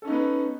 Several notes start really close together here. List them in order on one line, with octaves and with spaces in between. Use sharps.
A4 C#4 D#4 B3 B4